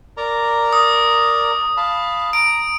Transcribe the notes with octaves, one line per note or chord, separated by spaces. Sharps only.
A#4 D5 A#5
D#6
F5 A5 B5
A#5 D7